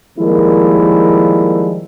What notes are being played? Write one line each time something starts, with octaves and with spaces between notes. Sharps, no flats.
D#3 F3 G3 G#3 A#3 E4